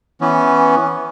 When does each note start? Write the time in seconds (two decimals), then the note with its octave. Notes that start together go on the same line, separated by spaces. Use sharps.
0.21 E3 B3 C#4